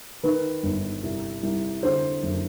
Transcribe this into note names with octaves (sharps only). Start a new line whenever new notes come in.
D#3 B4
G1
C2
C2
D3 C5
F#1